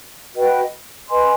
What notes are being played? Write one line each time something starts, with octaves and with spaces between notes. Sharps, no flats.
F#4 B4 D#5 G5
B4 D#5 G#5 C6